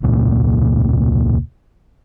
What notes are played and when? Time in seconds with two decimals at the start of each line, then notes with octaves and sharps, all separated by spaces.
0.02 E1 C#2 A#2